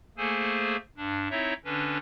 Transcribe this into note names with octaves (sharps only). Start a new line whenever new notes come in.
A3 A#3 G#4 A4 C5 G#5
G2 D4
C4 D#4 E4 C#5 E5
D3 C#4 D4 B4